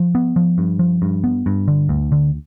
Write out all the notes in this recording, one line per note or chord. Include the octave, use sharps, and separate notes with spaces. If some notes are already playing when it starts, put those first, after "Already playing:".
Already playing: F3
B3
F3
G2
F3
G2
B3
G2
D3
D2
D3